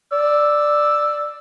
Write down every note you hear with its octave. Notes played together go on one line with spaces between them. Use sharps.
D5 E6